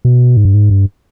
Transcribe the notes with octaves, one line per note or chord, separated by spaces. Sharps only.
B2
G#2
G2
G#2
G2